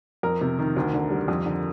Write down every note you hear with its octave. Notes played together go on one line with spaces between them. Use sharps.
F2 A#4
C3
D#3
D2
D3
G3
F2
D3